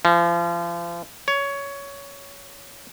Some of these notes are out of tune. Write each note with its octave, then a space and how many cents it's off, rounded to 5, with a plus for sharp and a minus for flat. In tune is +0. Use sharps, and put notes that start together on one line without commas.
F3 -35
C#5 +15